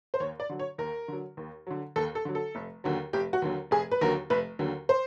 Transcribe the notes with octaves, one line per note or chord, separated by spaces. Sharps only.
C5
D#2 C#5
D5
D3 F#3
C#5
D#2 A#4
D3 F#3
D#2
D3 F#3
D#2 A4
A4
D3 F#3
A4
F1
D#2 D3 F#3
F1 G4
F#4
D#2 D3 F#3
F1 G#4
B4
D#2 D3 F#3 A#4
F1 B4
D#2 D3 F#3
C5